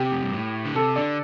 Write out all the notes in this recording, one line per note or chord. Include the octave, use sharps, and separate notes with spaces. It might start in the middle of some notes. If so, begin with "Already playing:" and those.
Already playing: C3 G4
F2
G2
A2
D3
C3 A4
D3 D5